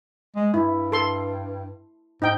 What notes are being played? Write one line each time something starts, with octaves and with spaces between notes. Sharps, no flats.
G#3
G2 E4
A4 C6
G#2 D#4 G5